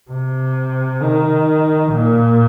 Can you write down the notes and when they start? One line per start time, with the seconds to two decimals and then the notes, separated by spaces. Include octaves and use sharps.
0.11 C3
1.02 D#3
1.93 A#2